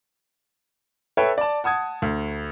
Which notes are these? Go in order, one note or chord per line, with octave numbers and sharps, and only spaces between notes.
A4 B4 C#5 E5 G5
D5 A5
F#5 A5 D#6 G#6
D2